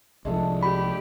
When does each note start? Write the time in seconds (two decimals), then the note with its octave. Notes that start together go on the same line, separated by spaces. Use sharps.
0.25 C2 C3 F3 G#3 A3 D4
0.63 G4 B5